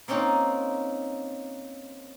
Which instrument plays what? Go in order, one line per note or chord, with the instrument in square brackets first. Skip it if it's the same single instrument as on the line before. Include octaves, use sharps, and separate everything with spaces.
[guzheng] A#3 C4 C#4 D#4 F4